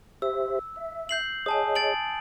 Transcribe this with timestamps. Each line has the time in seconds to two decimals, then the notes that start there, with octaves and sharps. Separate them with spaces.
0.22 G4 C5 E5 E6
0.76 E5
1.09 G6 C7 F#7
1.46 G#4 C#5 D#5 G#5 A5 D#6
1.75 A6 D7 F#7